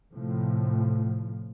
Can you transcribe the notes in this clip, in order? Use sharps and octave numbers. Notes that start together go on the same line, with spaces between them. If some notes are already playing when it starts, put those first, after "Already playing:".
A2 C3 F3